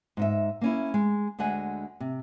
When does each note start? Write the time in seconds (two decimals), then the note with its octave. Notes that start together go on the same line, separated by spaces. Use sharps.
0.17 G#2 D#4 E5
0.61 A#3 C#4 E4
0.94 G#3
1.39 D2 D3 G#3 F#5 G#5
2.00 C3